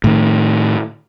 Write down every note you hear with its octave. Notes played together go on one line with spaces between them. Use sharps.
A2 D#3